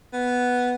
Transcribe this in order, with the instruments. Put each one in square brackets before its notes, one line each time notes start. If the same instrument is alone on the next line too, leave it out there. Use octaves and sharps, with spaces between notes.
[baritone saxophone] B3